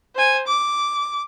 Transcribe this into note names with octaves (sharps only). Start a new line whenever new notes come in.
C5 G#5
D6